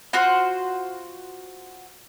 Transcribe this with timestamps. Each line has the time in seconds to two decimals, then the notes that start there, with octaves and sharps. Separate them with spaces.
0.13 F4 F#4 C5 F#5